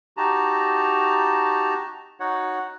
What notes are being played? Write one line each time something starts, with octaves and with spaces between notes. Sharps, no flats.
D#4 F#4 G4 A5 A#5
D#4 F#4 C#5 F#5